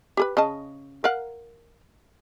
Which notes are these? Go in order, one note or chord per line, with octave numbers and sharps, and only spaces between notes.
G4 G#4 B4
C#3 D#5 A5
A#4 F5 F#5